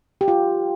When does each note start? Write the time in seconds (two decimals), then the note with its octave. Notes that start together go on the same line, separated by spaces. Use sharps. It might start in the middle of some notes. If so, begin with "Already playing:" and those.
0.21 G4
0.28 F4